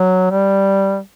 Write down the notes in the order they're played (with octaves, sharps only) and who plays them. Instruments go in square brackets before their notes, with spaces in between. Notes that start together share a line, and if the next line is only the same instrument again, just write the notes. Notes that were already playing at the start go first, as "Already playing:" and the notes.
Already playing: [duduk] F#3
G3